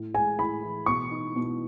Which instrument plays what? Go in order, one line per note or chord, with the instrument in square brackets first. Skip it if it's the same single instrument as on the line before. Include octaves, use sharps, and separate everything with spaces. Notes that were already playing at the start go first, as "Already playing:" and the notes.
Already playing: [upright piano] A2
[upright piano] G#3 [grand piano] G#5
[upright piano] A2 [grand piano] B5
[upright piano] E3
[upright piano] B2 [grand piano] C#6
[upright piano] D#4
B2